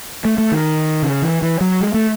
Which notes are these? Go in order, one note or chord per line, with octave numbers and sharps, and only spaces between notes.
A3
A3
D#3
C#3
E3
E3
F#3
G#3
A3